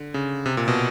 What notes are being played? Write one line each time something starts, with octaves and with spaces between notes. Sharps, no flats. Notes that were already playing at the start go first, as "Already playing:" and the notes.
Already playing: D3
C#3
C3
A#2
B2